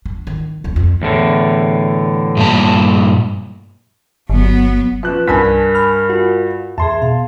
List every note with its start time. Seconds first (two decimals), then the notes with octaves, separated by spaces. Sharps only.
0.06 D4
0.27 D#3
0.64 D#1 C#2
0.76 F2
1.02 E2 A2 D3
2.37 G2 A#2 A5
4.30 G1 F#3 B3
5.03 F3 C#4 B4 F#6
5.28 C2 G2 A#4 G#5 A5 B6
5.75 B5 F6
6.10 F4 F#4
6.78 E2 G#4 E5 A5 C6
7.02 B2 F5